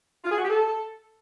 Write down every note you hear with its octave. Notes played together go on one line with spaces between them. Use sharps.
F4
G#4
F#4
G4
A4